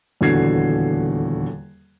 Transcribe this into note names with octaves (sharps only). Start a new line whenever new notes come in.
D#1 E2 D3 F#4 G#6 C7